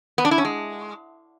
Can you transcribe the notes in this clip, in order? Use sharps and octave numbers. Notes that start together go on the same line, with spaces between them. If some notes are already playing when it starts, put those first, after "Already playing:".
B3
D4
E4
C#4
G#3